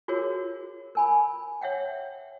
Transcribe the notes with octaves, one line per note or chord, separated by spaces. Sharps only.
F4 F#4 G#4 A#4 C#5
A#4 G#5 B5
C#5 E5 F#5 G5